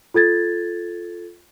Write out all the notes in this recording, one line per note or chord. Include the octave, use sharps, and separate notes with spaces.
F4 A4 G#6 A6